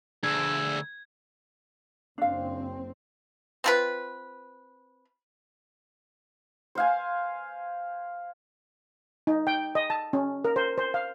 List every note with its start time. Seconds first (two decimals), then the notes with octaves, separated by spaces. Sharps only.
0.24 D2 D4 G#4 E6 G#6
2.18 F#1 C4 D4 F5
3.64 C4 F4 B4
6.75 C5 F5 G#5
9.27 D#4
9.47 G5
9.75 D#5
9.90 A5
10.13 C#4
10.45 A#4
10.56 C5
10.78 C5
10.94 F5